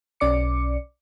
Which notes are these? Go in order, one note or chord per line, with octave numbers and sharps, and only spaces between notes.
B1 C#4 D5 D6 C#7